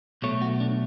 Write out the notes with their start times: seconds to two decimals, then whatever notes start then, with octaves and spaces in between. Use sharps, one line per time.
0.22 B1 B2 A3 C#5
0.42 F#4
0.60 D4